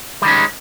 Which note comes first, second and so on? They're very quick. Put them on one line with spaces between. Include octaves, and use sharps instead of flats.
G3 D#3 C#4 G#3